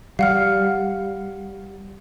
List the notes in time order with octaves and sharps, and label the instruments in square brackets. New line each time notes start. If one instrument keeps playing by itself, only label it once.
[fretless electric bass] G3 [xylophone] F5 F#5 F6